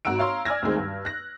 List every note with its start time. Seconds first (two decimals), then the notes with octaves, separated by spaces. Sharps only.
0.05 G#1 F#4 A#5 E6 D7
0.19 C#5 F5 A#5 C6
0.45 D5 G#5 E6 F6 G#6 A#6
0.62 D2 D#3 G#3 C4
0.77 G2
1.05 F#6 A#6